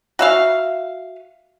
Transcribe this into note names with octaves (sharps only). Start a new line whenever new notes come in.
F#4 E5 F5